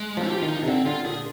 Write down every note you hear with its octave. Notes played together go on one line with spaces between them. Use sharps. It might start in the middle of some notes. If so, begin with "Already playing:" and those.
Already playing: G#3
F3
F3 G4
D#3 F4
D#4
C3 D4
D3 C4
D3 F4
A#2 G#4